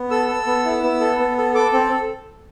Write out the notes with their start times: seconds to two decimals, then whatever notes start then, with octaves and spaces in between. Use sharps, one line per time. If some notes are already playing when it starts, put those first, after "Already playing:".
Already playing: B3
0.11 A4 E6
0.28 A4
0.47 B3
0.65 E4
0.83 B3
1.00 A4
1.20 B3
1.38 A4
1.54 A4 D6
1.73 C4